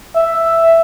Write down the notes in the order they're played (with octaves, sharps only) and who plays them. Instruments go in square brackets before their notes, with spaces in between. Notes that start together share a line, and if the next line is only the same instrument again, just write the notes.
[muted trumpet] E5